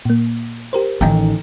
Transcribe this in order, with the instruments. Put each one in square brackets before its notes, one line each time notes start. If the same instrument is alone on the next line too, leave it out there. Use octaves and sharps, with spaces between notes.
[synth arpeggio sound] A#2 A#3
G4 A#4 C5
[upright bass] A1 D#3 [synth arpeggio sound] D#4 G5 A#5